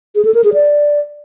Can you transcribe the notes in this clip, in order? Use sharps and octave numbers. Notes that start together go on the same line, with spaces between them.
G#4
A4
A#4
G#4
D5